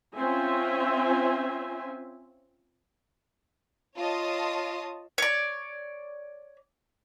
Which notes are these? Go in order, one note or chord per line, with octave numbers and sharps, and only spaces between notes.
C4 C#4 F4 C5 E5 G#5
F4 C#5 D#5 A5 D#6
C#5 D5